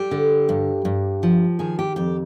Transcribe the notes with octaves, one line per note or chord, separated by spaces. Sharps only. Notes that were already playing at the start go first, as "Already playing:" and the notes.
Already playing: G3 G4
D3
G2
G2
F3
D#3 G#4
G4
F2 G4